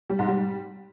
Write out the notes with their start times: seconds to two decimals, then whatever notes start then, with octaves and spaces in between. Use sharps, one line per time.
0.10 G3
0.19 G#2
0.28 G3